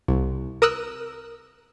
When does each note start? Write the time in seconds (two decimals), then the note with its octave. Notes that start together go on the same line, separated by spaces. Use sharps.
0.08 C2
0.62 A#4 D#6 E6 F#6